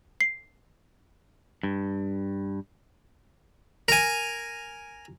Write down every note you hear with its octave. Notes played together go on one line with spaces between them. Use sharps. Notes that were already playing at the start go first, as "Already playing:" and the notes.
C7
G2
A#4 G#5